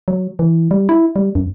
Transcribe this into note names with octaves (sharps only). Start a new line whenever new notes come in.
F#3
E3
G3
E4
G3
F#2